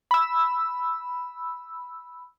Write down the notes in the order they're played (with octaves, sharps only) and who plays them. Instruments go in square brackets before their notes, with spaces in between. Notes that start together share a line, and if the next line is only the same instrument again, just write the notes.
[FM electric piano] B5 E6